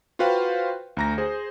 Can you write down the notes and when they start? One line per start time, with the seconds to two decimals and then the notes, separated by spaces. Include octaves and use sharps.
0.19 F4 F#4 B4 C5 F5 G5
0.97 D2 A#5 A#6
1.18 G#4 C5